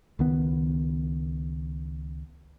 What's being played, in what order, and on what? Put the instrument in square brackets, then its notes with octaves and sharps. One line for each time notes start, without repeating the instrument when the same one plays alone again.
[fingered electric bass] C#2 D#3 B3